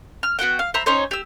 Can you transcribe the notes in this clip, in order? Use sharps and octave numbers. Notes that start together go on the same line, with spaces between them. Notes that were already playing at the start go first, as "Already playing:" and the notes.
F6
B3 F#4 F#5 G5
F5
C5 E5 A#5 B5
C#4 D#4 C5 C#5
G4 E6